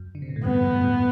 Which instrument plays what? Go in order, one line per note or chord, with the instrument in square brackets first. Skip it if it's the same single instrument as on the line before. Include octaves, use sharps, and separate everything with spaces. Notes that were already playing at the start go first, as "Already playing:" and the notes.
Already playing: [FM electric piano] F#2
D3
C3
B2
A2
[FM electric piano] E2 G2 [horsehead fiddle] B3
[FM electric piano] F#2 A2
F#2 A2